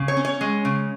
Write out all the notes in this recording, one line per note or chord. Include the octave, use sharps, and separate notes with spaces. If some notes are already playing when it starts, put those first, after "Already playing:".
Already playing: C#3
C#5
C#4
C#5
G#3
C#3